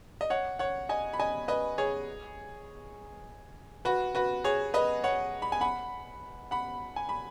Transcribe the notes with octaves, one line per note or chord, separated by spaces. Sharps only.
D#5
C#5 F#5
C#5 F#5
D#5 G#5
B5
D#5 G#5
B4 D#5
G#4 C#5
F#4 B4
F#4 B4
G#4 C#5
B4 D#5
C#5 F#5
B5
G#5
F#5 B5
F#5 B5
G#5
B5